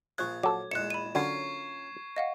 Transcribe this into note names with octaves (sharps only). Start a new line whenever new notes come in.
A#1 F3 G#4 C#6 F#6 G#6
F#3 A4 D6
A#1 E2 G#3 F#6 C#7 E7
B5 D#7
D3 F#3 A#3 C#4 F4 C#6 G#6 C7
D#5 F5 F#5